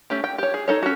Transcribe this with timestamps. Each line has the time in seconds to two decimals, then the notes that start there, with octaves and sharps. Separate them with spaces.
0.10 A3 C#4 G4
0.24 G5
0.38 G4 C#5
0.54 G#4
0.68 D#4 A4 C#5
0.82 C#4 F#4